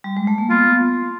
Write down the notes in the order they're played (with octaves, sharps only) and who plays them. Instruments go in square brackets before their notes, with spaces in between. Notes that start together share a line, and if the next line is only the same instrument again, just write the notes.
[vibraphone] G3
G#3
A3
A#3
[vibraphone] B3 [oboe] F4